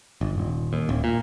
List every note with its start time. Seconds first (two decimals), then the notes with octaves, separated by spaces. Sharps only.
0.21 G1
0.38 D#1
0.73 D#2
0.89 D1
1.04 A#2